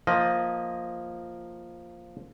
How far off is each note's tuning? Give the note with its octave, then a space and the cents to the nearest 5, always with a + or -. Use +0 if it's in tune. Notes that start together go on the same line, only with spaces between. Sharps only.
F3 +0 A#3 +0 D#5 +0